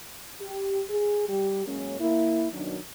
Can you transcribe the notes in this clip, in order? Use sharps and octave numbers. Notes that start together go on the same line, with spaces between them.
G4
G#4
G3 G4
F#2 G#3 A#3 C#4
A#3 E4
F#2 B2 D#3 F#3 D4 D#4